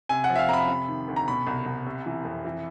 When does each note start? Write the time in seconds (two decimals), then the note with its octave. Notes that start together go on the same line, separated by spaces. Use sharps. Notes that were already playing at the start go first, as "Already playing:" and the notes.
0.09 C3 G#5
0.24 F#5
0.30 F3
0.36 E5
0.39 F5
0.49 F2 A#5
0.53 B5
0.68 C3
0.88 D#3
1.08 D2
1.16 A#5
1.28 B2 B5
1.47 C2
1.66 C2
1.86 C3
2.06 E3
2.25 F2
2.45 E3